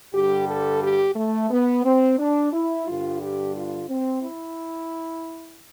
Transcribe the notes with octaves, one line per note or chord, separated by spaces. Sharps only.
G2 D3 G3 G4
A4
G4
A3
B3
C4
D4
E4
G2 D3 G3 F4
G4
F4
C4
E4